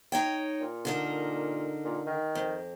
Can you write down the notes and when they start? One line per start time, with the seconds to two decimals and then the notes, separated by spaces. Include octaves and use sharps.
0.12 D#4 C#5 G5
0.61 A#2
0.85 D3 D#4 A#4
1.85 A#2
2.06 D#3
2.35 F2